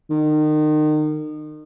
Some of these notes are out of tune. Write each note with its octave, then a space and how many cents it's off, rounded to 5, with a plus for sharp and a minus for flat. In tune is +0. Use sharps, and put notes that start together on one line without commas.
D#3 -30